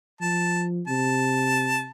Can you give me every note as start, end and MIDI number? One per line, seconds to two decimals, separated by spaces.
0.21 0.83 53
0.21 0.63 81
0.88 1.90 48
0.88 1.90 81